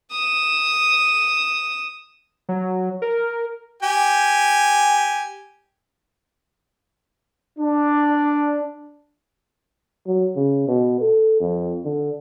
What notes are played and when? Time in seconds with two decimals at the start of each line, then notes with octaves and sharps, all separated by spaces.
0.12 D#6 E7
2.49 F#3
3.02 A#4
3.83 G4 G#5
7.59 D4
10.07 F#3
10.36 C#3
10.68 B2
11.00 A4
11.40 F2
11.85 D3